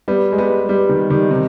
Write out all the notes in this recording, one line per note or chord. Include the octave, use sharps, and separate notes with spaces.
G3 B3
G#3
G3 B3
G3 B3
D#3 G3
D#3 G3
C3 D#3